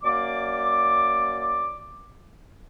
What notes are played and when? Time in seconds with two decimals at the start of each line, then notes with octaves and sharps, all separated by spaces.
0.03 F#2 A#3 D5 D6